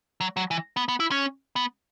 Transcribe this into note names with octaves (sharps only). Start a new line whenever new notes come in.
F#3
F#3
E3
B3
B3
E4
C#4
B3